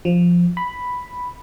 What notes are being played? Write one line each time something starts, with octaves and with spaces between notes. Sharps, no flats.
F3
B5